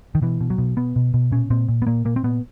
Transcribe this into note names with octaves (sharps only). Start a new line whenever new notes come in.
D#3
B2 E3
B2
F#3
B2
B2 B3
B2
B2
A#2 C#4
A#2 C4
A#2
B3
A#2 A#3
A#2 A#3
C4
A#2 B3